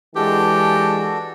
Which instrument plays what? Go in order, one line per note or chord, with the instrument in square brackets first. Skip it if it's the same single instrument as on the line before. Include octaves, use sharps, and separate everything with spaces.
[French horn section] E3 G#3 [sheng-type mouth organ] D4 F#4 A4 [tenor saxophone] G4